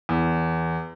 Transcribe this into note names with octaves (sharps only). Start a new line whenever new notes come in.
E2